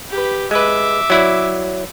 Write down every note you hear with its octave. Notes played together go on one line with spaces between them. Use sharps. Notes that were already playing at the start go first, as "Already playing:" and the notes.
G4 B4
G#3 B4 E5 D6
F#3 E4 D5